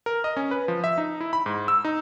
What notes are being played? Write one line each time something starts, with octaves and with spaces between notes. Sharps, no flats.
A#4
D#5
C#4
B4
F3
E5
D#4
E4
B5
G#2
E6
D#4